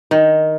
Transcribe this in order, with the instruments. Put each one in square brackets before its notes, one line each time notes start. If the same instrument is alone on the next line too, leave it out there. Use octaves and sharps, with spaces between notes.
[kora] D#3